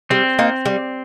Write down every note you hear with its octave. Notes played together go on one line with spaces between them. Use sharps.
G3 C4
A#3 D#4
G3